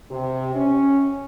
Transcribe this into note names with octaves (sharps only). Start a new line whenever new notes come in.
C3
C#4